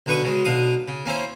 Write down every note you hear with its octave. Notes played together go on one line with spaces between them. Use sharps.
B1 D3 D4 B4 C#6 D#6
C#3 F#3 G#3
B1 B2 D4 F5 D#6
C#3
A#3 C#4 E4 C5